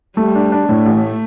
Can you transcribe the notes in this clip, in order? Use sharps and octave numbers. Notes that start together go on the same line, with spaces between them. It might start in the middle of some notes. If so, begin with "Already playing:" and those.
G3 A3
D4
D4
A2 A3
A1